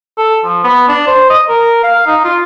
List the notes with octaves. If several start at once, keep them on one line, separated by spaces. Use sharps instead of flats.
A4
F3
B3
D4
C5
D#5
A#4
F5
D#4
F4